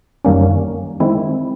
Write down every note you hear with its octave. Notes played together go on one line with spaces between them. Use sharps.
F#2 D#3 G3 A#3 C#4
D#3 G#3 C4 E4